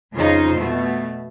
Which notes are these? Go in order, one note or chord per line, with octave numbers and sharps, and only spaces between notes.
F2 C#3 D#4 F4 C5
B2 A3